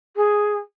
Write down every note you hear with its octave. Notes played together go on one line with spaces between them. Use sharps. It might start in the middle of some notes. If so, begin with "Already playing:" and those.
G#4